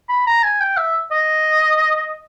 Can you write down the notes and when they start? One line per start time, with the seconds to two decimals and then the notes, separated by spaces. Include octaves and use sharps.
0.09 B5
0.27 A#5
0.43 G#5
0.60 G5
0.77 E5
1.12 D#5